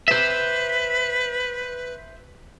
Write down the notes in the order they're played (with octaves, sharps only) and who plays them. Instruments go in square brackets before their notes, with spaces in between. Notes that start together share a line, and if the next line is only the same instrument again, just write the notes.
[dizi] B4 [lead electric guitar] C5 E5